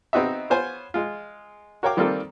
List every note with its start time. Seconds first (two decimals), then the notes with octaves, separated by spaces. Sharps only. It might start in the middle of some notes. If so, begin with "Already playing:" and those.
0.13 B3 C4 D#4 F#4 D#5 E5
0.50 B3 F4 C5 C#5 G#5
0.94 G#3 F4
1.83 F#4 A#4 C#5 F5 G5 D6
1.97 D#3 G3 A#3 C4 F4 A4